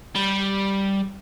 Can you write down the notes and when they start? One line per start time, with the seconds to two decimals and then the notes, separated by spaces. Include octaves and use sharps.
0.16 G3